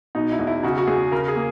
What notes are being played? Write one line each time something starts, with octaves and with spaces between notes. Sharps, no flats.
B2 D#4
E4
E2
E4
C#3 F#4
F#4
E2 G#4
C#3 A#4
G#4
A#3